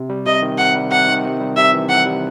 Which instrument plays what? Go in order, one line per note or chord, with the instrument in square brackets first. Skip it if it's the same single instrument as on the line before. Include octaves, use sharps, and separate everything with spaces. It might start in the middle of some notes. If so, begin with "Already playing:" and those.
Already playing: [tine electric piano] C3
G3
[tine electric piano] C3 [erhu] D#5
[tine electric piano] D#3
[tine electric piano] C3 [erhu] F#5
[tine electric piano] G3
[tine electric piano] C3 [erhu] F#5
[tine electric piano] D#3
C3
G3
[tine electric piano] C3 [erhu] E5
[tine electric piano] E3
[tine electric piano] C3 [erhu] F#5
[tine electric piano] G3